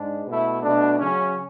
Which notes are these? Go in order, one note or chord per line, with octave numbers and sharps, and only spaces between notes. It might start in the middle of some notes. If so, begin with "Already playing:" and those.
Already playing: G#2 G#3 D4
B2 A3 E4
B2 A3 D4
C#3 F#3 C#4